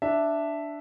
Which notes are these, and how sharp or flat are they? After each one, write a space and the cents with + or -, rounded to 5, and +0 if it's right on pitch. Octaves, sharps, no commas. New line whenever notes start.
D4 +0 E5 +0